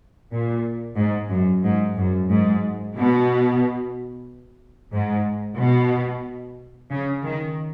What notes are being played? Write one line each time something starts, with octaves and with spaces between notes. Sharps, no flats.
A#2
G#2
F#2
G#2
F#2
G#2
B2
G#2
B2
C#3
D#3